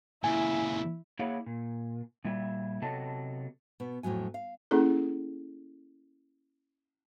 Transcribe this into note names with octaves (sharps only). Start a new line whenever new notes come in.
A#2 C#3 E4 G#5
A#3 E4 G#4 C#5 F5 F#5
A#2
A#2 G3 E4 E5
C3 F#3 B3 A4 D#5 A5
B2 B3
F2 A2 C3 F#3 G#5
F5
A#3 C#4 E4 G#4 A4